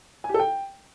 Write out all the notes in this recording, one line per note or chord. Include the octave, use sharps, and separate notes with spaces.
G#5
G4
A4
G5